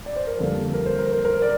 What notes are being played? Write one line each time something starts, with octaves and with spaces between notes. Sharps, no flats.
D5
C5
A#4
F2 D3 G3 A#3 A4
A#4
C5
A#4
C5
A#4
D5